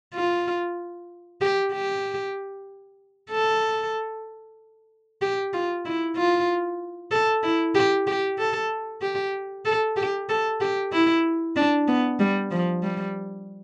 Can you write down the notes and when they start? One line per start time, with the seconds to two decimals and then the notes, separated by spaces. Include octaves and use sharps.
0.14 F4
1.41 G4
1.73 G4
3.31 A4
5.22 G4
5.54 F4
5.85 E4
6.17 F4
7.11 A4
7.43 E4
7.75 G4
8.07 G4
8.39 A4
9.02 G4
9.65 A4
9.97 G4
10.29 A4
10.61 G4
10.92 E4
11.56 D4
11.88 B3
12.20 G3
12.51 F3
12.83 G3